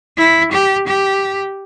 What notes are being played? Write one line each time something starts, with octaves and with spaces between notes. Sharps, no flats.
E4
G4
G4